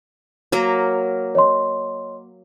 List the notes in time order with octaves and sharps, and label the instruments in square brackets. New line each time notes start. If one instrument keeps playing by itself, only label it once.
[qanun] F#3 A#3 A#4
[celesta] C#5 D#5 C6